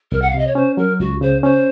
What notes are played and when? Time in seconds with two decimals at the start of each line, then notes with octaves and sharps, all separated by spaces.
0.12 C2 A#4
0.21 F#5
0.30 F5
0.34 C3 D#5
0.47 C#5
0.55 C#4 C5
0.77 F#3 A#4
1.00 C#2 F#4
1.21 C#3 C5
1.43 C#4 C5